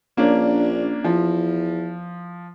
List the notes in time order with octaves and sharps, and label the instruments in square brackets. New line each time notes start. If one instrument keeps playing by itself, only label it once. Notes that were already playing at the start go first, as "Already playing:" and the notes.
[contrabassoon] A#1 [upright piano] A#3 C#4 D4
[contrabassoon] E2 [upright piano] F3